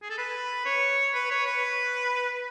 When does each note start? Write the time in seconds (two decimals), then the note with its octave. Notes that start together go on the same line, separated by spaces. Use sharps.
0.02 G#4
0.10 A4
0.18 B4
0.65 C#5
1.14 B4
1.31 C#5
1.46 B4